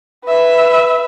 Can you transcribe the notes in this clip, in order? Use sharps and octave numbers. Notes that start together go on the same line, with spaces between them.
B4 E5